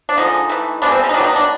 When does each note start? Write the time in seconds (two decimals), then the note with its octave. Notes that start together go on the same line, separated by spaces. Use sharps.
0.09 D4
0.17 D3 F3 G#3 D#4
0.50 E3 A3
0.82 B2 G#3 B3 D4
0.92 C4
1.03 C#4
1.09 D#4
1.14 D#3 F#3 B3 D4
1.24 D#4
1.36 D4